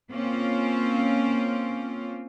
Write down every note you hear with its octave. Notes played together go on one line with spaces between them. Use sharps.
A#3 C4 C#4 F4